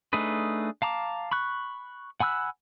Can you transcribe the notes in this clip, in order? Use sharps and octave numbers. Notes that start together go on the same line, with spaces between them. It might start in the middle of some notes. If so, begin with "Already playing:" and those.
A3 D4 D#4 G#4 B4
F5 A5 A#5 D6
B5 C#6 F#6
F#5 G#5 B5 E6 F#6